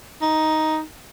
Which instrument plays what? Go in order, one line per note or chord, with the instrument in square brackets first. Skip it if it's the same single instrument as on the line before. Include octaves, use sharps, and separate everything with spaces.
[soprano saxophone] D#4